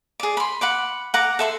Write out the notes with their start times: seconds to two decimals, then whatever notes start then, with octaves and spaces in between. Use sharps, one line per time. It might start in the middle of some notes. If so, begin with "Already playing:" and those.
0.20 G#4 D5
0.37 B5 C6
0.61 F#5 B5 D6
1.14 F#5 A#5 D6
1.39 A4 E5 C6